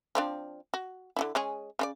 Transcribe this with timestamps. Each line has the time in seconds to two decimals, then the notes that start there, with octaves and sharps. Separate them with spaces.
0.15 F3 C4 D4
0.74 F#4
1.16 D3 D#4 E4
1.35 G#3 C#4 G#4
1.79 C#3 F4 D5